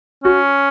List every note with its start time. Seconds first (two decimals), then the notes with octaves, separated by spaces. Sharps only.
0.24 C#4 F#4